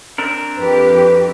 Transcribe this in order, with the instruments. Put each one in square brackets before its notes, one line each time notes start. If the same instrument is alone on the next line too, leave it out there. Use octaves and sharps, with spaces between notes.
[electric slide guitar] C4 D4 A#4
[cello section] F2 G4 [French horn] B4